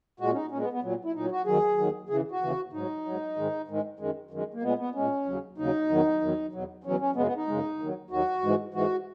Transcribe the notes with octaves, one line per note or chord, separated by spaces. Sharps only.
A#2 G#3 F#4
C#4
D#4
A#2 G#3 C#4
B3
B3
A#2 F#3
E4
A#2 F#3 D#4
F#4
D#2 D#3 F#3 G#4
D#2 D#3 F#3
D#2 C#3 E3 G#4
F#4
D#2 C#3 E3
G#2 F#3 D#4
G#2 F#3
G#2 D#3 G#3
G#2 D#3 G#3
F#2 D#3 G#3
F#2 D#3 G#3
A#3
A#2 G#3 B3
B3
A#2 G#3 C#4
D#2 C#3 F#3
D#2 C#3 F#3 D#4
E2 D#3 F#3
E2 D#3 F#3
E2 B2 F#3
E2 B2 F#3 C#4
C#4
F#2 C#3 G#3 B3
B3
D#4
F#2 C#3 G#3
D#2 D#3 F#3
D#2 D#3 F#3 F#4
G#2 E3 G#3
G#2 E3 G#3 F#4